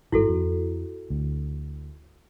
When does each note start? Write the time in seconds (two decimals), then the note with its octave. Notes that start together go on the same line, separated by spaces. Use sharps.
0.12 G#1 G2 E4 F#4 A4
0.29 F2
1.10 D2